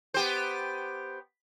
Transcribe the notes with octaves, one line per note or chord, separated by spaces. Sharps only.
B3 G4 C5